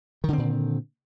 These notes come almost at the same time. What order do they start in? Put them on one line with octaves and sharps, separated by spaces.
D#3 D3 C4 A#2